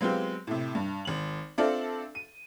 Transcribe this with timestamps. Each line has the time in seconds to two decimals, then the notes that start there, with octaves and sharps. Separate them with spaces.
0.01 F#3 G#3 B3 C4 F4 G4
0.47 A2 C3
0.75 G2
1.05 G#1 F#7
1.58 C4 D4 F4 A4 D5 E5
2.15 D#7